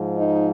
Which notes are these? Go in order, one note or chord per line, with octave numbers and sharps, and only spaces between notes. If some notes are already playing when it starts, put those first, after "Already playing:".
Already playing: G#2 F3
D#4